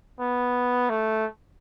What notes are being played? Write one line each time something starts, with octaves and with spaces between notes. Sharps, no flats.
B3
A3